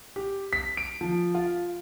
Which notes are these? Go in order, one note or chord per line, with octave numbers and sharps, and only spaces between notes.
G4
B6
D7
F3
F4